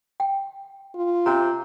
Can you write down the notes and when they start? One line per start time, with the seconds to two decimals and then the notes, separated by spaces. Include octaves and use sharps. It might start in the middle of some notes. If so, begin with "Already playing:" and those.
0.20 G5
0.95 F4
1.26 C3 C#4 A#5